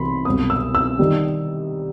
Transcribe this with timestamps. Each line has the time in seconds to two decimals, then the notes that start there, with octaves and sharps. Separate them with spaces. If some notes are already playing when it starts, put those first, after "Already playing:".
Already playing: C2 C3 E3 B3 B5 C6
0.25 C2 B2 F#3 B3 D#6
0.50 E6
0.75 E6
0.99 D#3 G3